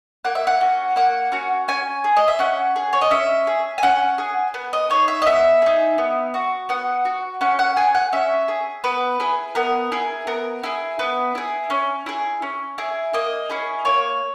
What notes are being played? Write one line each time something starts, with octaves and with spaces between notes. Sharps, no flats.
A#3 F#5
E5
F#5
C#4 F#4
A#3 F#5
C#4 F#4
C#4 G#5
G#4
D#5
E5
C#4 F#5
G#4
C#5
D#5
C#4 E5
G#4
G#5
C#4 F#5
G#4
B3
D#5
D#4 G#4 C#5
E5
D#5
B3 E5
D#4 G#4
B3
F#4
B3 F#5
F#4
C#4 F#5
F#5
G#4 G#5
F#5
C#4 E5
G#4
B3 B4
E4 G#4
B3 A#4
E4 G#4
B3 A#4
E4 G#4
B3 B4
E4 G#4
C#4
E4 G#4
C#4
E4 G#4
A#3 D#5
C#4 E4 G#4
A#3 C#5